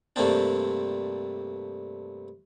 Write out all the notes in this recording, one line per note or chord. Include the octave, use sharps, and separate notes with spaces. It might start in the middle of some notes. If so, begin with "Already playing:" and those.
G2 C3 A3 A#3 C4 D4